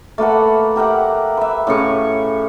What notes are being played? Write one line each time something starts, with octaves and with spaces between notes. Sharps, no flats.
A3 A#3 B4 F#5
G4 A#4 E5 F#5
B4 E5
A2 C#3 C#6 D6